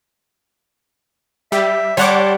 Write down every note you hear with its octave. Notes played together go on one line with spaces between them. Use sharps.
G3 G4 E5
G3 C#5 F#5 A5 C6 D6